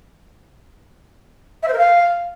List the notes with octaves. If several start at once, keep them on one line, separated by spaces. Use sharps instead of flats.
E5
C5
A#4
F5